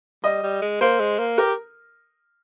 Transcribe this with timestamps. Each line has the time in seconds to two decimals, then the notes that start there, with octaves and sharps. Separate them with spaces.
0.24 G3 D#5
0.43 G3
0.62 G#3
0.81 A#3 C5
1.00 G#3
1.19 A#3
1.38 G4 A#4